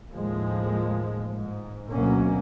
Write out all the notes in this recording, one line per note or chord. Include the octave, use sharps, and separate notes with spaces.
D#2 A2 F3 G#3
G#2
D2 B2 F#3 A#3 C#4